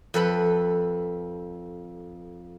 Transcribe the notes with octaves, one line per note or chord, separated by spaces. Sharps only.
F2 A4 B4 B5